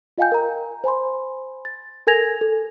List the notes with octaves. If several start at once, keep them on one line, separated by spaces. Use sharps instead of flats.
F4 D#5 F5 G5 G#5 G6
A#4 A#5
C5 G#5 B5 C6
A6
A4 A#4 G#5 G#6 A#6 F7
A4